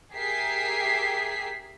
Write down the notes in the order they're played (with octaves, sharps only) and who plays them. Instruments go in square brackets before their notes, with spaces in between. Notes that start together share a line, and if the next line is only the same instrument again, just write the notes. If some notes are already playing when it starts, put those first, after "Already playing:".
[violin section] G4 G#4 A#4 E5 B6 C7